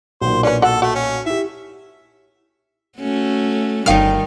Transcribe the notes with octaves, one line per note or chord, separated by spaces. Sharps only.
B1 A#2 C5
C#4 D4 B4
F#4 A4 F#5
A3 F#4
C#4
E4 G4 E5
A3 C#4 F#4
G1 D#3 G3 D#4 F5 F6